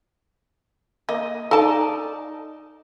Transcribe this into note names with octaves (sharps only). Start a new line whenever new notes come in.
A#3 D#5
D#4 A4 D5 A5